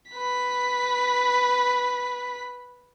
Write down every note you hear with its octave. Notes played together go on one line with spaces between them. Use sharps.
B4 B6